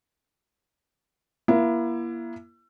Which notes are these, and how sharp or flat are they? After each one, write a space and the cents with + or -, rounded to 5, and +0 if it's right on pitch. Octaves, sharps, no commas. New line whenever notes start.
A#3 +35 E4 +30